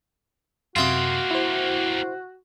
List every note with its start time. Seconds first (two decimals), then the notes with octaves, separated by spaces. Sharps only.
0.76 F#2 C3 A#3 C4 F4 F#4 E5 D#6
1.31 E4 C5